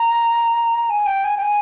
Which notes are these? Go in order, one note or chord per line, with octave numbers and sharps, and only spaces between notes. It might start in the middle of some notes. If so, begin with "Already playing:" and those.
Already playing: A#5
G#5
G5
G#5
G5
G#5